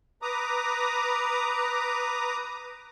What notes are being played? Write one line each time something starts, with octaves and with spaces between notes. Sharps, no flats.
B4 A#5 D6 D#6